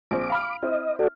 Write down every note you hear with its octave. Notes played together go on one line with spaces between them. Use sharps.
A#1 C4 D6
F5 B5 F6
C4 E4 D#5
F#4 A4 D5